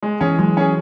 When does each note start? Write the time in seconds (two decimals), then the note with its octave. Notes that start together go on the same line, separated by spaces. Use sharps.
0.03 G#3
0.20 E3 C#4 G#4
0.38 F#3 G#3
0.57 C#4 G#4